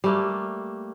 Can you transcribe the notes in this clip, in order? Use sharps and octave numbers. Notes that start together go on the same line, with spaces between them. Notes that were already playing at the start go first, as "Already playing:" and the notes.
G3 A3 A#3